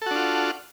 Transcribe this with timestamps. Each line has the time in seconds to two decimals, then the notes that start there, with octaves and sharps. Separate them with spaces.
0.02 A4
0.06 F#4
0.11 D4
0.16 F4